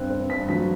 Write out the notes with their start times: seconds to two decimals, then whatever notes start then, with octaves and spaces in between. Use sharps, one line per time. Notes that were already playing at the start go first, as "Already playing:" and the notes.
Already playing: G2 C4 F#6
0.10 C4
0.30 G2 B6
0.49 F#3 B6